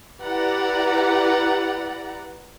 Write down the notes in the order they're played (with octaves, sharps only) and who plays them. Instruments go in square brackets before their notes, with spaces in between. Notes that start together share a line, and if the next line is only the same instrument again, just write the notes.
[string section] E4 G4 B4 D5 F#5 A#5